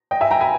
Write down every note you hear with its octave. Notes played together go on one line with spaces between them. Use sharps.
D#5 G5
E5 G#5
G5 A#5
G#5 B5